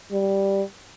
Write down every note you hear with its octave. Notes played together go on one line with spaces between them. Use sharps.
G3